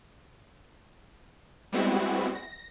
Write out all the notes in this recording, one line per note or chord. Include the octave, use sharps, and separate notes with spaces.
G3 G#3 B3 C4 E4 F#4
A#6